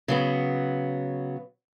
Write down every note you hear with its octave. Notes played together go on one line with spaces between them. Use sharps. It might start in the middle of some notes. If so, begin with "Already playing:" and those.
C#3 F#3 B3